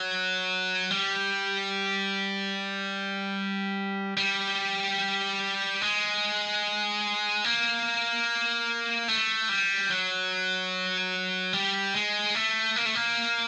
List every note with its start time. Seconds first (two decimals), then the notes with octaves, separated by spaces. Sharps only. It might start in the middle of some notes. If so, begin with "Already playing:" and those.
Already playing: F#3
0.91 G3
4.17 G3
5.81 G#3
7.44 A#3
9.08 A3
9.49 G3
9.90 F#3
11.53 G3
11.94 G#3
12.35 A3
12.76 A#3
12.85 A3
12.95 A#3